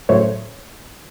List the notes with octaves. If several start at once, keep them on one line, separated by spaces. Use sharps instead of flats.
A2 C#3 F#3 A3 C5 C#5